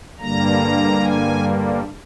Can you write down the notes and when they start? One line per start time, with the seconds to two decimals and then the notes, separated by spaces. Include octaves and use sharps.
0.19 G2 D3 G3 A#3 A#5
1.02 G#5